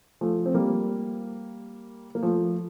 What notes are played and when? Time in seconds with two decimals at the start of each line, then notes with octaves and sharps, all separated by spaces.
0.21 F3 A3
0.46 C4
0.54 G3 A#3
2.15 A#3
2.22 F3 A3